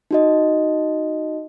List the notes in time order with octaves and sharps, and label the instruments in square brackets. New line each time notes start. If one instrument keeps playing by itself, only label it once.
[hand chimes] D#4 F#4 D#5